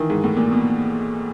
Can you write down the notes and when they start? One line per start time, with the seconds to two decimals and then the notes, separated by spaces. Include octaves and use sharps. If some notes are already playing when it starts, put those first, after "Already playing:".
Already playing: D#3 E3
0.10 G#2
0.24 A2
0.36 A#2
0.51 B2